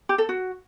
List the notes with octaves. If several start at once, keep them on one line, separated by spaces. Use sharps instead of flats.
G4
A4
F#4